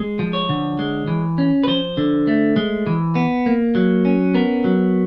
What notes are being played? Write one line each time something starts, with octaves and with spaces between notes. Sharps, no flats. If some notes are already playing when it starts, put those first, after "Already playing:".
Already playing: G#3
F3
C#5
D3
G#3
E3
C#4
B4
F3 C5
D3
A3
G#3
E3
B3
A#3
F#3
C#4
B3 A#4
F#3